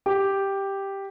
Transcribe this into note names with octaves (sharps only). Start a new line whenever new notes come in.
G4